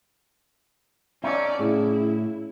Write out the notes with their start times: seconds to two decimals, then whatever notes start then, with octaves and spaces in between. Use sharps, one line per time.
1.24 C#4 D#4 A4 D5
1.60 A2 C#3 E4